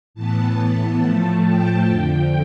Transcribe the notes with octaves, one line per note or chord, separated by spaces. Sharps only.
A2 E3 B3 A5
A2 F3 A3
G5
F2 D3 F3